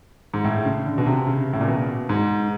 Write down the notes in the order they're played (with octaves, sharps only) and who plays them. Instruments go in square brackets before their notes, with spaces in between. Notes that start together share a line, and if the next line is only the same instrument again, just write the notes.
[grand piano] G#2
A2
C#3
D3
B2
C3
C#3
A2
A#2
B2
G#2